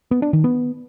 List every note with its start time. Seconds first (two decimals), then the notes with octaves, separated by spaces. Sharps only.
0.11 B3
0.22 D4
0.33 D#3
0.44 B3